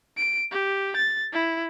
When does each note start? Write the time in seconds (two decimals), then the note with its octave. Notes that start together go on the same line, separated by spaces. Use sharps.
0.17 D7
0.51 G4
0.96 A6
1.33 E4